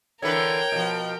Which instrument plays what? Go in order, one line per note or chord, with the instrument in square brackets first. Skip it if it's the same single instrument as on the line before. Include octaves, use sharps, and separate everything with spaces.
[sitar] D3 E3 B4 [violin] A#4 G5 [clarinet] C#5
[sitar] B2 F3